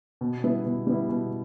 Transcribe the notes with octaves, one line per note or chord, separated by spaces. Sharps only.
B2
G3 B3 E4
B2
G3 B3 E4
B2